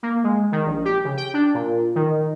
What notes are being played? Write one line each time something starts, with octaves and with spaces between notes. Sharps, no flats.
A#3
G#3
D#3
A#1
G4
C#3
G5
D4
A#2
D#3